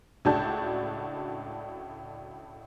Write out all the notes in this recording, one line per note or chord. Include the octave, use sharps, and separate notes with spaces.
C#2 A2 D4 F#4 A5 G6